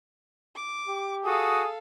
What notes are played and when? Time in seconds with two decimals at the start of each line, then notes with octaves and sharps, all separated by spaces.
0.56 D6
0.87 G4
1.24 F#4 G#4 A4 F5 D#6